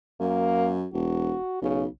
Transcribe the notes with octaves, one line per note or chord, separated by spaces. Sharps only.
F#2 A#3
E1 F#4
B1 C#3